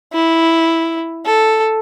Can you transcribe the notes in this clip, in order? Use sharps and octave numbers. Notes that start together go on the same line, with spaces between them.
E4
A4